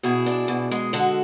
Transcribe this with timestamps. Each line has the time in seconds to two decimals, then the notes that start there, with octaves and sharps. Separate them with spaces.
0.03 B2 E4 G#4
0.26 D4
0.48 B2
0.71 G#3
0.93 D3 F#4 A4